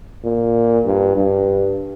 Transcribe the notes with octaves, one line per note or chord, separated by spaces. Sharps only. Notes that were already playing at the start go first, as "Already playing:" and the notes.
A#2
G2
G2